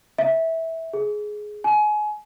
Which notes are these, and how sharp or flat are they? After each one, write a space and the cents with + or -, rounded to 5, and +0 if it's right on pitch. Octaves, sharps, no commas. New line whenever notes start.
E5 -15
G#4 +10
G#5 +25